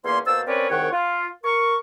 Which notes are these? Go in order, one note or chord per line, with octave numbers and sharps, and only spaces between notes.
E2 A#2 A#3 C#4 C6
B2 A#3 C5 A5 E6
C4 C#4 A#4 B4 C#5 D5
C2 G#2 D#3 C#5 F#5 G5
F4
A#4 C#6